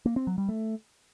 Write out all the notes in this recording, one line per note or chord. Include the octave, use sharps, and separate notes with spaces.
A#3
C4
F#3
G3
A3